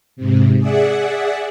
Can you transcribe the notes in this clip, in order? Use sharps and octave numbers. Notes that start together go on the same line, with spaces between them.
G#2 C3
G#4 D5 E5 F#5